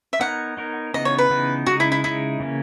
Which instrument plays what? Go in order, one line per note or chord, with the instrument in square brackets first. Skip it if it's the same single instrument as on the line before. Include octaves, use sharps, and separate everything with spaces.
[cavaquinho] E5
[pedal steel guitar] B3 D#4 A#4 C#5 [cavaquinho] F#5
[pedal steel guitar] B3 D#4 A#4 C#5
[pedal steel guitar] C#3 E3 B3 D#4 [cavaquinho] D#5
[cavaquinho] C#5
B4
[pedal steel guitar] C#3 E3 B3 D#4
[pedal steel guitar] C#3 G#3 D#4 [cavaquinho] F#4
[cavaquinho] E4
E4
[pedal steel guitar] C#3 G#3 D#4 [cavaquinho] E4
[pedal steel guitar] C#3 E3 A#3 C#4